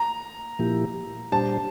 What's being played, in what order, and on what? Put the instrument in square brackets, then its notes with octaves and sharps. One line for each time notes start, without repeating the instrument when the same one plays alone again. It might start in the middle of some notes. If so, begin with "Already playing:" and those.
Already playing: [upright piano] A#5
[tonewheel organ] A#2 F3 A#3 E4 G4
[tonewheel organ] A#2 G3 D4 G4 C5 [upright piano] A5